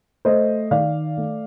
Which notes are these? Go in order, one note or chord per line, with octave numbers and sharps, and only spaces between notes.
A3 C5 D#5
D#3 D5 F5
A3